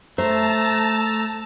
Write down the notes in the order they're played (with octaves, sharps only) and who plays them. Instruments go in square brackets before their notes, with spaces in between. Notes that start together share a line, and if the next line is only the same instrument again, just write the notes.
[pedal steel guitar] A3 [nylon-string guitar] C5 [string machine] A5 [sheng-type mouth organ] A#5 E6